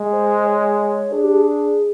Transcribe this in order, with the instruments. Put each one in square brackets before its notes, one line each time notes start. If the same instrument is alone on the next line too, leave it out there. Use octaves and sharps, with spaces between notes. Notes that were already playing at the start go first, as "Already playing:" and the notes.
Already playing: [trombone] G#3
[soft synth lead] C5
C#5
[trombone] D4 [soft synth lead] G#4
[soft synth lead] G4
G#4